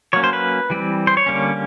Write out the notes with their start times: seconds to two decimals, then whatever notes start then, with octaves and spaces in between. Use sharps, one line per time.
0.13 F#3 A#3 C#4 C#5
0.24 C5
0.33 B4
0.70 E3 G3 C4
1.07 C5
1.17 C#5
1.26 D3 G3 A#3 C#4